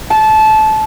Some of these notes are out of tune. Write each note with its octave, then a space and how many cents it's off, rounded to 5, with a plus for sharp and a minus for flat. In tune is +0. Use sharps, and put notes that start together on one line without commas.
A5 -20